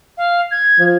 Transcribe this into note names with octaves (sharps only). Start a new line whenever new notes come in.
F5
G#6
F3